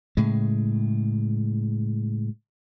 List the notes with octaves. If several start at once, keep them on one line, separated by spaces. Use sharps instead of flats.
A2 C#3 G#3